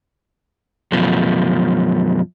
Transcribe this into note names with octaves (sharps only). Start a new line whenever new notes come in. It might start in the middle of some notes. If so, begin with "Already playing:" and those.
F#2 B2 F3